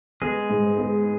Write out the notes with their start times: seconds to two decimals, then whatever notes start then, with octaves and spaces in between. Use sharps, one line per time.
0.22 G#3 B3 G#4
0.50 G#2
0.77 B3